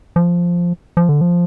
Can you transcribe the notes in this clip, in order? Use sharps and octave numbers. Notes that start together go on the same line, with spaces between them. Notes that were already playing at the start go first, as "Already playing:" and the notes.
F3
F3
D3
F3